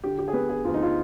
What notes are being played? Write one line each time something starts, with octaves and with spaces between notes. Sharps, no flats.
D3 G4
G4
G#4
B3 B4
G#4
D2 F4
D#4
F4